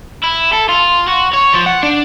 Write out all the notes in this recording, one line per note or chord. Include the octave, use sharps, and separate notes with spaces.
E4
A4
F4
F#4
C#5
F3
F#5
D4